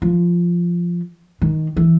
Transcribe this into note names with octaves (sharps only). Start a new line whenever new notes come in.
F3
D#3
E3